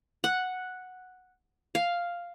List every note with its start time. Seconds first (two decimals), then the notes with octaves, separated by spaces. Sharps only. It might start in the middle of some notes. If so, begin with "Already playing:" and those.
0.24 F#5
1.75 F5